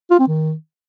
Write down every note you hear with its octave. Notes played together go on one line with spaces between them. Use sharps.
F4
C4
D#3